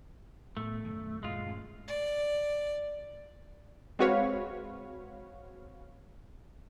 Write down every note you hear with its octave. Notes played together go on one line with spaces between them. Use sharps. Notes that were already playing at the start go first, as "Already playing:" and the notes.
A2 A3 B3
B1 F#2 D#3
F#2 A#2 G#3 F4
G2 A3 C#4
D5
G#3 C4 F#4 B4 C#5 F5